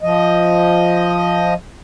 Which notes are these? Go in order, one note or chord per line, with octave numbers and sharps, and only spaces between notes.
F3 D#5